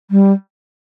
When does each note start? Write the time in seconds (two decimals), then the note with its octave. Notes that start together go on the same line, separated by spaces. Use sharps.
0.10 G3